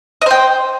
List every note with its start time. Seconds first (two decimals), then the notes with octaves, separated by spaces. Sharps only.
0.22 D#5
0.26 C5
0.31 G5